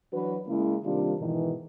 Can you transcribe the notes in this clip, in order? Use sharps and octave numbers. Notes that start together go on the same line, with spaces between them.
E3 F#3 D4 F#4 B4
C#3 G#3 A#3 C#4 E4
C3 D#3 G3 A#3 D4 F4
G#2 B2 D#3 E3